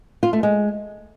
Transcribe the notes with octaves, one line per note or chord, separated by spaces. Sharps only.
F4
A3
G#3